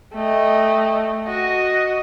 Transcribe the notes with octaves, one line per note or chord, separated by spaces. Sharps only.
A3 D#5 G5
F#4 D#5